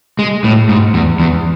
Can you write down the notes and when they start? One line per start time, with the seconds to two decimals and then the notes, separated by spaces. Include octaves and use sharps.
0.19 G#3
0.44 A2
0.69 G#2
0.94 E2
1.20 E2